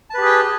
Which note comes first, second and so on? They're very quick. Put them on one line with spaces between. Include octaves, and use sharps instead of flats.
A5 B4 G4 G#4 G5